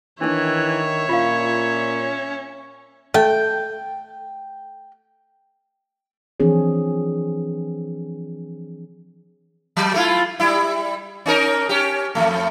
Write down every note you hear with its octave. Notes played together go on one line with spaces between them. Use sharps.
D#3 E3 D4 D#4 C#5 E5
A#2 C#4 F4 F5
A3 G5
E3 F3 C4 D4 G#4 C#5
F#3
A3 E4 F4
G3 E4
C#4 D#4 A#4
C#4 G4
F2 C3 A3